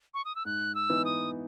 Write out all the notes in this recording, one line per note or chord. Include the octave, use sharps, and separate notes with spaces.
C#6
D#6
E6
G#2 F#6
E6
E3 B3 D#4
D#6